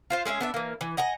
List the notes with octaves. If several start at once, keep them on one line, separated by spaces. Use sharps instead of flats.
F4 C5 F5
G#3 C#4 G#4 E5
B3 D4 E5
E3 A#3
E3
D#5 F#5 G#5 A#5